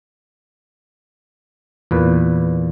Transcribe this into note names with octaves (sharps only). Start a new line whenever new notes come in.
E2 A#2 B4